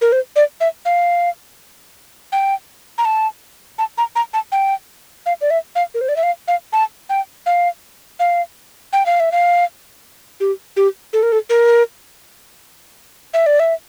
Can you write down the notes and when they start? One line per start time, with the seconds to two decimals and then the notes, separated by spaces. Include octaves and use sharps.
0.01 A#4
0.12 C5
0.36 D5
0.61 E5
0.85 F5
2.32 G5
2.98 A#5
3.05 A5
3.78 A5
3.98 A#5
4.16 A#5
4.34 A5
4.52 G5
5.26 F5
5.41 D5
5.50 E5
5.75 F5
5.94 A#4
6.01 C5
6.09 D5
6.16 E5
6.23 F5
6.48 F5
6.73 A5
7.09 G5
7.46 F5
8.20 F5
8.93 G5
9.06 F5
9.20 E5
9.32 F5
10.40 G4
10.77 G4
11.13 A4
11.23 A#4
11.32 A4
11.50 A#4
13.34 E5
13.46 D5
13.60 E5